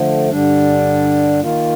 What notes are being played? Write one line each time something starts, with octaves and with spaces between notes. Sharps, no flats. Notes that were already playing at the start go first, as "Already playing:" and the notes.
Already playing: D3 F3 A3
G2 D3 G3 D4
D#3 A#3 F4